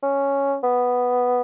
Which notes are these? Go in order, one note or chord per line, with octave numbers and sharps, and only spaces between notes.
C#4
B3